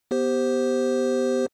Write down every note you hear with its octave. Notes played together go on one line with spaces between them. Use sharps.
B3 G4 C5